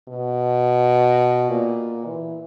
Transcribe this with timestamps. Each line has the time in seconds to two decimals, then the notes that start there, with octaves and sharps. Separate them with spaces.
0.08 B2
1.49 A#2
2.06 E3